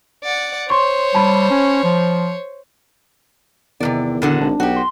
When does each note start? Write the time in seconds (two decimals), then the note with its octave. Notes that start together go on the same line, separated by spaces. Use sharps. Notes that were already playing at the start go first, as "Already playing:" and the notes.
0.24 D5 F#5
0.70 C5 C#5 C6 C#6
1.15 G3 A5 B5
1.51 C#4
1.84 F3
3.80 E2 C3 D#3 F3 D5
4.22 A#2 D3 F#4
4.41 G#1 D4
4.60 B1 F#4 G4
4.76 C6